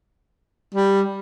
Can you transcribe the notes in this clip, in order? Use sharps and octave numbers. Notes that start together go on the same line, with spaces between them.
G3